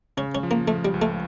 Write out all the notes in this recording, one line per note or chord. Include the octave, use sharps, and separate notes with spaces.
C#3 C#4
C#4
F3
A#3
F3 A3
G3
C#2
A3